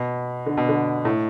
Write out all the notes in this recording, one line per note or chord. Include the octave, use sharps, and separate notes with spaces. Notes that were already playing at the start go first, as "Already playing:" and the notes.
Already playing: B2
D3
B2
D3
A2